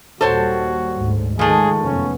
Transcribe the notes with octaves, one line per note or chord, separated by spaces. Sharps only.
D#2 A#2 G3 F#4 A4 C5 C#5
D2 G#2
D#3 F3 G#3 A3 G#4
F1 F#2 B3 C#4